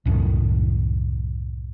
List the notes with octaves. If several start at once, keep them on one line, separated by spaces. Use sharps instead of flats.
C2 F#2 A2 D#3